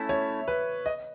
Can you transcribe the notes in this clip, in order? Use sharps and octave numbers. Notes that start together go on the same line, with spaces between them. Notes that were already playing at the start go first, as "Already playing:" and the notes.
Already playing: A3 C#4 E4 E5
C#5
B4
D#5